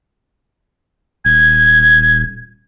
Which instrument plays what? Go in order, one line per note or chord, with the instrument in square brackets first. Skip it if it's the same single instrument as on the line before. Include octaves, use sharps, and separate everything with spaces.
[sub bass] D#1 [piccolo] G#6